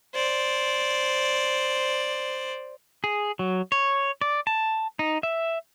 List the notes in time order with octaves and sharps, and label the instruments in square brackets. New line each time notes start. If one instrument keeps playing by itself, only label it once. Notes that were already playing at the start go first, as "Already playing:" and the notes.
[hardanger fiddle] C5 D5
[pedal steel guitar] G#4
F#3
C#5
D5
A5
D#4
E5